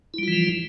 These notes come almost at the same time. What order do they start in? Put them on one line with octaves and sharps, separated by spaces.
E4 G3 F4 E3 F3